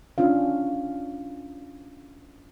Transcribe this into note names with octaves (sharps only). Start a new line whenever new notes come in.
C#4 D4 F4 F5